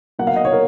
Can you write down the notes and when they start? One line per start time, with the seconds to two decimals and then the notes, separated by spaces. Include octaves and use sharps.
0.19 B2 F#3 A#3 F#5
0.27 F5
0.36 D#5
0.45 C#5
0.53 A#4